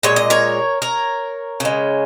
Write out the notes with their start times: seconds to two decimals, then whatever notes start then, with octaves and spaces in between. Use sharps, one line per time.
0.03 A#2 G#3 C#5
0.16 D#5
0.30 A#4 C#5
0.82 A#4 C#5
1.60 C#3 G#3